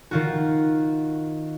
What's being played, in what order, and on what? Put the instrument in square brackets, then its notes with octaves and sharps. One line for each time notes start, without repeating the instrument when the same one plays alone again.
[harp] D#3 F4 F#4